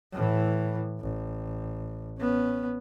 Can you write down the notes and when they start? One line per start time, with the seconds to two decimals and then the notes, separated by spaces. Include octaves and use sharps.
0.13 A2 E3
1.00 A1
2.18 B3 C#4